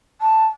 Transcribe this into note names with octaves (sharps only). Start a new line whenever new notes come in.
A5